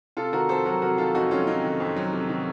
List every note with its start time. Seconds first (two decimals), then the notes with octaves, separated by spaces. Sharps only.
0.17 C3 F4 A4
0.32 D#3 F#4 A#4
0.49 F2 A4 C5
0.65 F#3 F#4 A#4
0.82 C3 F#4 A#4
0.98 D#3 F4 A4
1.15 F2 D#4 F#4
1.31 F#3 C#4 F4
1.47 C3 C4 D#4
1.64 D#3
1.80 F2
1.96 F#3
2.13 C3
2.29 D#3